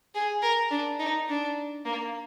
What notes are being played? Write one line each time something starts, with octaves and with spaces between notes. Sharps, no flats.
G#4
A#4
D4
D#4
D4
A#3